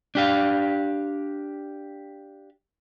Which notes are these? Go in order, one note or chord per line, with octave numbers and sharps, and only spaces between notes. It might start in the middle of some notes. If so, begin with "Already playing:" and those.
D4 G4 F5